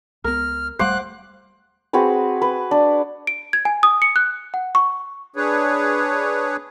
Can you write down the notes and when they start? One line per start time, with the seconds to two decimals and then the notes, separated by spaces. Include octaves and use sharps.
0.24 C#2 B3 A#4 F6
0.79 D#1 G3 A3 C5 F5 F#5 D6 F#6
1.93 C4 F#4 G#4 B4
2.42 B4
2.71 D4
3.27 D7
3.53 G#6
3.65 G#5
3.83 D#6
4.02 C#7
4.16 F#6
4.54 F#5
4.75 C#6
5.36 D4 G#4 B4 C#5